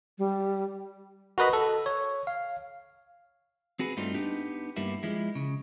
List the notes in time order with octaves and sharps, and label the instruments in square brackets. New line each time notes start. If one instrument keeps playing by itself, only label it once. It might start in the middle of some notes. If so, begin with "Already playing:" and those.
[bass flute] G3
[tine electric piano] F#4 A#4 B4 D#5 B5
A4
C#5
F5
[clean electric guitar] C4 F#4 G#4 B4
G2 A3 C4 D4 D#4 F4
B3 D4 D#4 G4
G2 G3 A#3 B3 E4
F3 G#3 E4
C#3